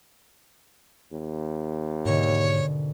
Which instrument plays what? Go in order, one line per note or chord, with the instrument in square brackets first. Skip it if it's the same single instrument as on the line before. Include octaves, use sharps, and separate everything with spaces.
[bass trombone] D#2
[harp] G#1 B2 D3 [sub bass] G#2 [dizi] C#5